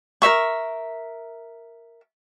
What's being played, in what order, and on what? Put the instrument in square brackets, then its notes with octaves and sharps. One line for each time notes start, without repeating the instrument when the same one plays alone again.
[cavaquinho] A#4 C5 E5 C#6